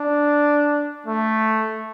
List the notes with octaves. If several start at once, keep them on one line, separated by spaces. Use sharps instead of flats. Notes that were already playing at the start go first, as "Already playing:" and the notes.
Already playing: D4
A3